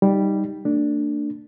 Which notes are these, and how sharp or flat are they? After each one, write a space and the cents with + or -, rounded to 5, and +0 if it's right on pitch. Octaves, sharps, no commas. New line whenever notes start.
G3 +0 D#4 +0
A3 +40 D4 +0